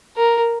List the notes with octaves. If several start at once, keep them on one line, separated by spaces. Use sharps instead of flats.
A#4